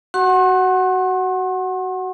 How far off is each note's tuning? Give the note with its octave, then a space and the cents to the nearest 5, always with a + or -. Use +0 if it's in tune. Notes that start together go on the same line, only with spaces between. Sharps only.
F#4 +15 F#5 +0 C6 +45